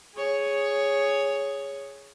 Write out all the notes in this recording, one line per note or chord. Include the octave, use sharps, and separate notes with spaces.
G#4 C#5